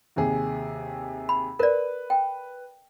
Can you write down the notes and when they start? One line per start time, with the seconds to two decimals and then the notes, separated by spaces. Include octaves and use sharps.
0.16 D#2 C3 G#4
1.29 B5
1.59 A#4 B4 D5
2.10 G5